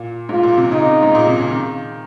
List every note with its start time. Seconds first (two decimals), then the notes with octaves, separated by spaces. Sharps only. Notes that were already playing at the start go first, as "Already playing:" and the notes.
Already playing: A#2
0.29 G#2 F4
0.43 A#2
0.58 C3
0.71 C#3 D#4
1.02 G#2
1.15 A#2
1.27 C3
1.39 C#3
1.50 D#3